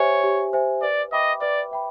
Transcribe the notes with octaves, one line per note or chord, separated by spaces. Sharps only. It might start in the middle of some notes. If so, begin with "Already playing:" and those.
Already playing: G4 C5 C#5 E5 G#5
G4
C5 E5 G#5
B4 D5
D#5 E5 G5 B5 D6
B4 D5
E5 G5 B5